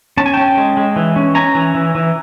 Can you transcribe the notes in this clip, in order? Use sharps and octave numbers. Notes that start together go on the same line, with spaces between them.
C#4 A5
G#5
C#4 G5 A5
G#3
G#3
E3
C#4
C#4 G#5 A#5
E3
E3
E3